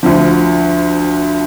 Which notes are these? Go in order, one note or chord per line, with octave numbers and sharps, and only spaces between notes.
D2 D3 F3